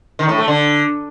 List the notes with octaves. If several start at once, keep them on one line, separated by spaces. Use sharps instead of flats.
D#3
A2
A3
D3